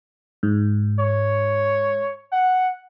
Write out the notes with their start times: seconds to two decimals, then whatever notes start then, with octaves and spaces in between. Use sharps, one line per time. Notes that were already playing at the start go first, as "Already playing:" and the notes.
0.43 G#2
0.99 C#5
2.32 F#5